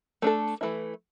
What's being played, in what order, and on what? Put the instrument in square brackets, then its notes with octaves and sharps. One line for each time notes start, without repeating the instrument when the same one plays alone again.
[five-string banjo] A3 D4 A4
E3 A3 E4